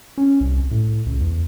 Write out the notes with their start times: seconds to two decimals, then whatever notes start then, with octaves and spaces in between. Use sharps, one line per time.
0.18 C#4
0.41 C2
0.71 A2
1.06 C#2
1.20 E2